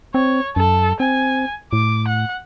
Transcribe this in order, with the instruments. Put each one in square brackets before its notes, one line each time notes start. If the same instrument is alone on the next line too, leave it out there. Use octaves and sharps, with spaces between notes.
[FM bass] C4 [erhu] C#5
[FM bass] F#2 [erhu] A4
[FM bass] C4 [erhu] G#5
[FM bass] A2 [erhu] D6
[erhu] F#5